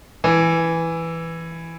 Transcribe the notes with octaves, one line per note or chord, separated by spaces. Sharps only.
E3